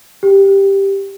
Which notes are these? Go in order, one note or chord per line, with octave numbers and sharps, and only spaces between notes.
G4